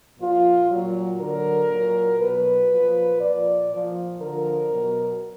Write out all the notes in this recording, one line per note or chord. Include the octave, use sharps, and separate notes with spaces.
A#2 F3 F4
A#2 F#3
D3 F#3 A#4
A#2 F#3
B2 F#3 B4
A#2 F3
A#2 F3 D5
A#2 F3
D3 F3 A#4
B2 F#3